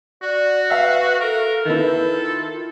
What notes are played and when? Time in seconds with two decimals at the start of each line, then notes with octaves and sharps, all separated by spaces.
0.22 F#4 D5
0.70 B4 E5 F5
1.21 A4 A#4
1.65 D#3 E4 A4 B4
2.18 F4